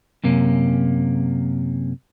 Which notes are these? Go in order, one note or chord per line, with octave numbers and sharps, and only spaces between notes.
F#2 C3 A#3 C#4